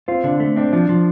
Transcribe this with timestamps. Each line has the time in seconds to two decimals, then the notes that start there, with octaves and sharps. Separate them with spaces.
0.08 C4 F4
0.24 D3 D4
0.40 A3
0.56 C4 D4
0.73 F3 D4
0.89 F3